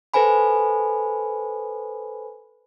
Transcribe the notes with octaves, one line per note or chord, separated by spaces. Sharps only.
A4 B4 C5 G#5 B5